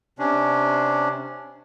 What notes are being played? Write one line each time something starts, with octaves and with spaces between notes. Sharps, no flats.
C3 C#4 D4